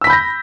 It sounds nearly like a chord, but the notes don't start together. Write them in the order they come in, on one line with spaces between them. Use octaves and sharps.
E6 B6 B5 G6 A#6